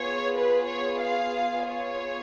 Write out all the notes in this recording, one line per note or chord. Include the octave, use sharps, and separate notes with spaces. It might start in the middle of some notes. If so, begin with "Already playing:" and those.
Already playing: B3 F4 G#4 C#5
B4
C#5
F5
C#5